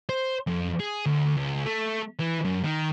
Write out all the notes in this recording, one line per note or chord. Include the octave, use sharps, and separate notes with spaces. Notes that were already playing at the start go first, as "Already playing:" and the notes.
C5
F2
G#4
D2
C#2
A3
E3
F#2
D#3